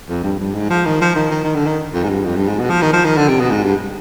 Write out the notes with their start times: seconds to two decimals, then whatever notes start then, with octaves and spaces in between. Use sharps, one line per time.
0.09 F2
0.24 G2
0.39 G2
0.54 G#2
0.70 F3
0.86 D#3
1.01 F3
1.16 D#3
1.31 D#3
1.44 D#3
1.55 D3
1.66 D#3
1.93 F2
2.04 G#2
2.09 G2
2.24 F2
2.36 G2
2.48 G#2
2.59 B2
2.70 F3
2.82 D#3
2.93 F3
3.05 D#3
3.17 D3
3.28 C3
3.40 B2
3.51 G#2
3.63 G2